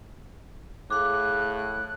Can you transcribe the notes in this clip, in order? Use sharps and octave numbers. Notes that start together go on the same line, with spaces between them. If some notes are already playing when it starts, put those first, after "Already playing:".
A2 G#4 F5 D6 F#6